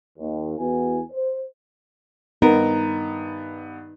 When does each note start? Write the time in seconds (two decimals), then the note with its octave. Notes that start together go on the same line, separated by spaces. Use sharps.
0.18 D#2
0.59 E2 B3 E4 F#4 G#5
1.12 C5
2.42 G2 B3 D#4 A#4